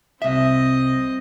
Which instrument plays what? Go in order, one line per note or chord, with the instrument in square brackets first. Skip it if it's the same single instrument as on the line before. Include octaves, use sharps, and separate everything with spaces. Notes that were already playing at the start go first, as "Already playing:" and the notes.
[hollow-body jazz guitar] C2 E5 [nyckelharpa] C4 D#5